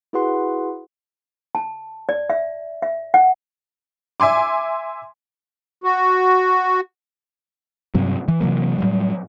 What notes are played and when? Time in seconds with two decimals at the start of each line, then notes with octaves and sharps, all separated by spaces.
0.13 E4 F#4 G#4 B4 F#5 C6
1.55 A5
2.09 D5
2.30 E5
2.82 E5
3.14 F#5
4.20 E5 G#5 C6 D6
5.84 F#4
7.95 G2 C3 F#3
8.28 E3
8.40 C3 E3 F#3 A#3
8.78 A2 F#3 G3